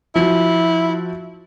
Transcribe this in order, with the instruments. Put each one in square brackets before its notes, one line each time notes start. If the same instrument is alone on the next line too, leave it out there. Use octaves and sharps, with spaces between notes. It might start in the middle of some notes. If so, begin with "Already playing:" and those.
[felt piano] F3 F#4 [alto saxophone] E4